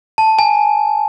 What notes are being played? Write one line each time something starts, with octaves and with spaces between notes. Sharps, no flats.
A5
G#5